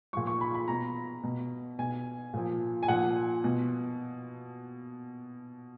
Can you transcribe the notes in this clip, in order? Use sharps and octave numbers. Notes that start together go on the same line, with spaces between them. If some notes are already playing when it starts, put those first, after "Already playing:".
A#2 F3 C#6
C#6
B5
B5
B2 A#5
B2
B2 G#5
A#2 F3
G#5
A#2 F3 F#5
B2